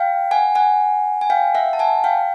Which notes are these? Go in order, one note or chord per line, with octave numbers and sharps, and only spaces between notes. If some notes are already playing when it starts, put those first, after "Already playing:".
Already playing: F5 G5
F#5 G#5
F#5 G#5
G#5
F5 G5
E5 F#5
A5
F#5 G#5
F5 G5